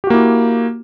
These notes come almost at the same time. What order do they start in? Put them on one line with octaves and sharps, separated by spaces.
G4 F#4 A#3 E4